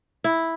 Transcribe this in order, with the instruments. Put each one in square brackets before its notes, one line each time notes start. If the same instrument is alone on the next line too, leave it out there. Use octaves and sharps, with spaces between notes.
[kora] E4